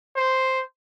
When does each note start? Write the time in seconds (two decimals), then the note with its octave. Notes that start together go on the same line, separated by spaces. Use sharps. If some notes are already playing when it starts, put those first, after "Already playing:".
0.16 C5